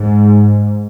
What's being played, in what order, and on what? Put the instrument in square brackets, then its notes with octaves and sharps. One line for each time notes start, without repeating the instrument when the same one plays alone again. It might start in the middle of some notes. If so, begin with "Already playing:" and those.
Already playing: [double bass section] G#2